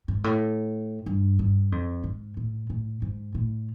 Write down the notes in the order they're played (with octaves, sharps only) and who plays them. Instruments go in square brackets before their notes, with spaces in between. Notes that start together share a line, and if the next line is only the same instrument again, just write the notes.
[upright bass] G#2
A2
G2
G2
F2
G#2
A2
A2
G#2
A2